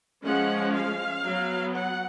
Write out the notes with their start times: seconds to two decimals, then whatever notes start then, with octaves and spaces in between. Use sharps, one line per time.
0.24 F3 G#3 C#4 F#5
0.75 F5
1.25 F#3 B3
1.74 F#5